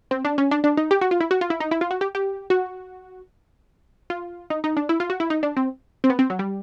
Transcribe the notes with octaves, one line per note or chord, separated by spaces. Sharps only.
C4
D4
C#4
D4
D4
D#4
G4
F#4
F4
E4
F#4
F4
E4
D#4
E4
F4
F#4
G4
G4
F#4
F4
D#4
D#4
D4
E4
F4
F#4
E4
D#4
D4
C4
C4
B3
C4
F#3
G3